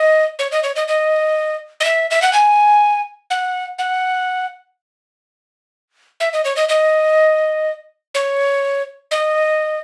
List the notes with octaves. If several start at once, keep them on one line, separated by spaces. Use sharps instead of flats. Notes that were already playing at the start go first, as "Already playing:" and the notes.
Already playing: D#5
C#5
D#5
C#5
D#5
D#5
D#5
E5
E5
F#5
G#5
F#5
F#5
E5
D#5
C#5
D#5
D#5
C#5
D#5